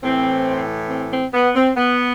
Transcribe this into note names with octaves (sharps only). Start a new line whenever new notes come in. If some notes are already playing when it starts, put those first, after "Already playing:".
A2 E3 C4
C4
C4
B3
C4
B3